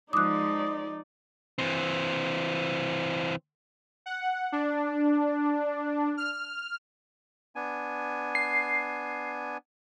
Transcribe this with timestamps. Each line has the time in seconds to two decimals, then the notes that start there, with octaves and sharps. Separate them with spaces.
0.13 F3 G#3 D#4 D5 D6 D#6 F#6
1.58 E3 C4
4.06 F#5
4.52 D4
6.17 F6
7.55 B3 D4 G#5
8.35 C7